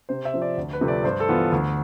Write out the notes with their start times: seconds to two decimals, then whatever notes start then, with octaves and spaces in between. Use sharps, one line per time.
0.09 C3 C5
0.25 E5
0.34 F3 C4
0.42 D5
0.58 D2
0.73 B4
0.81 C3 F3 A3
0.88 D5
1.04 G2 C5
1.20 A4
1.29 E3 B3 F4
1.52 D2